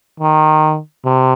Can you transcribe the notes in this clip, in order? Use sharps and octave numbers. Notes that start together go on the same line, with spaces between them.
D#3
C3